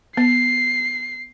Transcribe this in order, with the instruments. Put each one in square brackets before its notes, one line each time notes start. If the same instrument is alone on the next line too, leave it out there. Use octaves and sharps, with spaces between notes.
[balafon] B3 [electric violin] C7